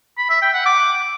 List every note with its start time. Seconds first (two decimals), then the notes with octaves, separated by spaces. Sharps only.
0.18 B5
0.30 E5
0.42 G5
0.54 F#5
0.66 D6